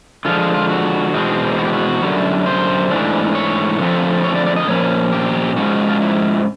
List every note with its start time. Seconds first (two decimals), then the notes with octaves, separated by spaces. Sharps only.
0.25 D3 F3 G#3 F4
0.39 F4
0.54 F4
0.69 F#4
1.14 E2 B2 G#3 C4
1.59 F#4
1.65 G4
1.73 F#4
2.02 F#2 D3 G3
2.46 C5
2.91 G#2 E3 A3 D4
3.35 C#5
3.79 D3 F3 A3 C4
4.24 C#5
4.35 D5
4.46 D5
4.56 D#5
4.67 A#2 F3 A#3 C#4 C#5
5.12 G4
5.56 G#2 F3 G#3 C#4 F#4
5.89 F4
6.01 E4